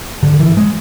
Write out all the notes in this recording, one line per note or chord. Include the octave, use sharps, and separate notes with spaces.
G#2 D3
E3
G#3